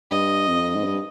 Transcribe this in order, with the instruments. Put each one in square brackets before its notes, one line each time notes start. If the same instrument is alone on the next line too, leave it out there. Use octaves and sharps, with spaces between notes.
[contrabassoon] G2 [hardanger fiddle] D#5
[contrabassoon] F2
G#2
G2